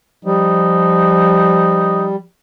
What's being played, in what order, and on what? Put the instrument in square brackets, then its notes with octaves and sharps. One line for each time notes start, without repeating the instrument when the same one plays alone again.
[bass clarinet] F3 [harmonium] G3 [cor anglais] D#4